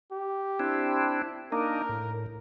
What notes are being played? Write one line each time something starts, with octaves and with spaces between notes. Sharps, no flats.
G4
C4 D4 E4
A#3 D4 D#4 A#4
A2